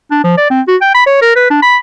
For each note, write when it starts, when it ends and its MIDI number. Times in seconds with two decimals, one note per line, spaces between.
0.11 0.22 62
0.24 0.34 53
0.38 0.47 74
0.51 0.61 60
0.68 0.76 66
0.81 0.91 79
0.94 1.02 83
1.07 1.19 73
1.22 1.35 70
1.36 1.50 71
1.51 1.58 62
1.62 1.77 83